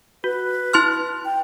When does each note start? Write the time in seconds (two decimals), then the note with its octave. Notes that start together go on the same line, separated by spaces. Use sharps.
0.24 F#4 B4
0.73 E4 C6 F6
1.25 G5